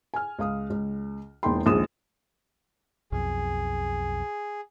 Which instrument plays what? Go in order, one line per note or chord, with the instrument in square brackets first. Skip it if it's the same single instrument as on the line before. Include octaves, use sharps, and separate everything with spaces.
[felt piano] G#5 F6
C#2 F5 D#6
C#2
E1 A#3 D#4 G5 B5 C6
A#1 D#2 A#2 G#3 D#6 E7
[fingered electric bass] B1 F2 [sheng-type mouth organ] G#4